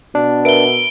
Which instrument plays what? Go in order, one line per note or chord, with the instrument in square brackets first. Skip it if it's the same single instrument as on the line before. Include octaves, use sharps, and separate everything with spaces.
[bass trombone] B2 [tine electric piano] D4
[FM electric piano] A#4 B4 E5 [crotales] D7 G7